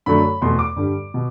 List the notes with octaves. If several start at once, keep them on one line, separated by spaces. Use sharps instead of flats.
F#2 D3 F#3 A3 B5
E2 B2 A3 C6
D6
G2 D3 G3
B2